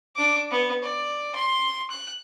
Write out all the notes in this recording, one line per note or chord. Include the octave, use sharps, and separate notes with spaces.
D4 D6
B3
D5
C6
F#6